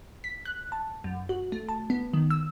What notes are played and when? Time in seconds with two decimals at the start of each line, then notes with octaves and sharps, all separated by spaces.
0.24 B6
0.45 F#6
0.72 A5
1.04 F#2
1.29 F#4
1.52 A3
1.69 A5
1.90 B3
2.13 D#3
2.31 E6